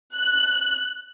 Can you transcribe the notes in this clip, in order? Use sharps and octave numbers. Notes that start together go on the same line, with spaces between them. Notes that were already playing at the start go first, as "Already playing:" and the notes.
F#6